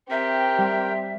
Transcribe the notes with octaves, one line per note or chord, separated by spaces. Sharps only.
C4 G4 A#4 E5 G5
G3